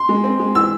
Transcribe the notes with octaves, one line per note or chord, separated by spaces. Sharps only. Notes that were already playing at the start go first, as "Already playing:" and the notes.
Already playing: C6
G#3
C4
G#3
E3 E6